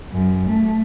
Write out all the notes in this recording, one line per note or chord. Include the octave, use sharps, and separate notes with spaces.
F#2
A3